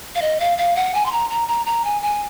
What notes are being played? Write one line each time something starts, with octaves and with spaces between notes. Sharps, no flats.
F5
D#5
F5
F5
F#5
G#5
C6
A#5
A#5
A#5
A#5
G#5
G#5